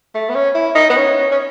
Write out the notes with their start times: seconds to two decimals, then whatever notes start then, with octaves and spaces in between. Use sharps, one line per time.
0.14 A3
0.29 B3
0.35 C#4
0.54 E4
0.75 D#4
0.89 B3
0.96 C#4
1.31 C#4